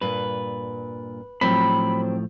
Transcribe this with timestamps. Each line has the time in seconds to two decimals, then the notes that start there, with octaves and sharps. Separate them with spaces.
0.01 G2 A#2 B4
1.41 A2 F3 F#3 C4 B5